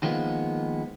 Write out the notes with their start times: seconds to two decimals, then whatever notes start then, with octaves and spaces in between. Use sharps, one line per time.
0.03 D#3 F3 G#3 A#3 B3